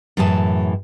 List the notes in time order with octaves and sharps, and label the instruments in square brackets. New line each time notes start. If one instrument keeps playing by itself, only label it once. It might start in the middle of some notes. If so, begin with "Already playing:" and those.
[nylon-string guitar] F#2 A2 E3 G#4 A5